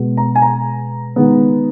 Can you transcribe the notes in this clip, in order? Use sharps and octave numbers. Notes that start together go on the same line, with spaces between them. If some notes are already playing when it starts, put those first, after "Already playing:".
Already playing: B2 G#3 B3
A#5
G#5
A#5
D#3 G#3 B3